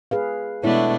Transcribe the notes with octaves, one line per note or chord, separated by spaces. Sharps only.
G#4 B4 F5
B2 G#3 A3 B3 D4 E4 C#5